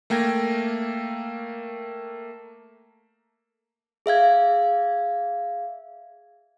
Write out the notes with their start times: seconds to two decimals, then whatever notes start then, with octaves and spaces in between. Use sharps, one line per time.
0.10 A3 A#3 G5 G#6 A#6
4.06 G#4 E5 F5 G#6